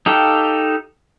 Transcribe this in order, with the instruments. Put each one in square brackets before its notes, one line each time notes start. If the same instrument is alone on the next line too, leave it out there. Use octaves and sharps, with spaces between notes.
[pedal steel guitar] D#4 G4 A4 F5 G5